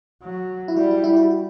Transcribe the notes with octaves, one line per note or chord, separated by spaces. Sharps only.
F#3
E4
G3 F#4
E4
E4
F#4
F#4